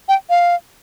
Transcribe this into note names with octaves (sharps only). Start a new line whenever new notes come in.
G5
F5